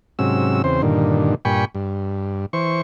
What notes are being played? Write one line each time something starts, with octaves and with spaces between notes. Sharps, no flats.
G#2 C3 F#3 C#4 E6
E2 C#3 C4 C5
G2 A#2 D3 D#3
G2 A#2 G5 G#5 B5 C#6
G2
E3 C5 C#6